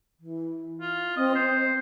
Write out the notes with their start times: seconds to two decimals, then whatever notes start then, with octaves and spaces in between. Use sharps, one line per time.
0.19 E3
0.81 F4
1.16 C4 D#5
1.35 C4 C5